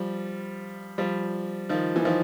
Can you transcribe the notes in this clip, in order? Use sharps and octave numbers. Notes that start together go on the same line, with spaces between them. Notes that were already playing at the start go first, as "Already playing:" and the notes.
Already playing: F3 G3
F3 G3
D#3 F3
E3
D#3 F3